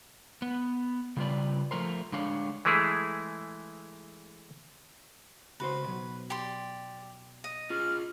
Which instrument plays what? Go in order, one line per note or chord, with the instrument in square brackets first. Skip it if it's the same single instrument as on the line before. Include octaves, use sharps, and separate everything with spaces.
[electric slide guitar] B3
C#3 G3 F4 G#4 B4 D5
F3 A3 A#4 C5
D3 G#3 D4 C#5 F5
[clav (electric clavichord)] E3 G#3 A3 E4 G#4
[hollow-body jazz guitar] C#2 F#4 C5 [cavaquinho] B4
[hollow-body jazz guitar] B2 F#3
[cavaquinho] G4 D5 C6
D#5
[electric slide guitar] F4 G#4 [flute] F6